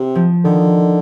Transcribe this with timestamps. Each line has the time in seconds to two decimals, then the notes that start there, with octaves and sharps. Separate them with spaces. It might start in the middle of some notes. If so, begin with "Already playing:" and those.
Already playing: C3
0.15 F3
0.45 D3 D#3